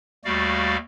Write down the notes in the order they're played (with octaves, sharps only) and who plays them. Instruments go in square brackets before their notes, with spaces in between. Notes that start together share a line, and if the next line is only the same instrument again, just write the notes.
[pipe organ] D#2 G3 A3 F#4 D5 F5